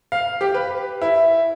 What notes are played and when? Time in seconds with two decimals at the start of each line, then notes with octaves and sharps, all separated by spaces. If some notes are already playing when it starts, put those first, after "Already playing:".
0.12 F5
0.41 G4
0.54 B4
1.02 E4